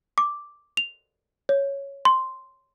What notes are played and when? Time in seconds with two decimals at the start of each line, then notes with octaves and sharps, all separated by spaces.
0.18 D6
0.77 F7
1.49 C#5
2.05 C6